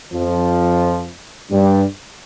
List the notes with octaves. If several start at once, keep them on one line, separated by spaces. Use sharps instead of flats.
F2 F3
G2 G3